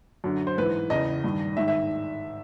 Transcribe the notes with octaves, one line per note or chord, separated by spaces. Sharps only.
F#2 D3
C5
G#2 E3 B4
E2 C#3 E3 D#5
G2 D#3
G#2 D#3 E5
E5